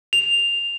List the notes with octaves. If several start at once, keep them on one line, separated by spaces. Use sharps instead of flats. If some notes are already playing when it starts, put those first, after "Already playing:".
F7